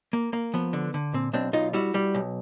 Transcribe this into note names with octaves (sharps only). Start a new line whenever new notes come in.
A#3
A#3
F3 B3
D3
D3
A#2 C4
B1 C4 D4
B1 D#4 F4
G3 E4 F#4
G3
B1